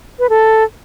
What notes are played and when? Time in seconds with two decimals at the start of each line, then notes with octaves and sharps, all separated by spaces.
0.19 B4
0.29 A4